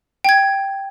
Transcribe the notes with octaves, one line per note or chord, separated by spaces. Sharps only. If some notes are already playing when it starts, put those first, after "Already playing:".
G5 G#6